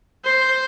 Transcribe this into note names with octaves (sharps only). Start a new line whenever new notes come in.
C5